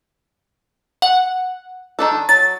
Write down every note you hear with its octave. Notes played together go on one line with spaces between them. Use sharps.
F#5
D#3 D4 A4
F#3 A6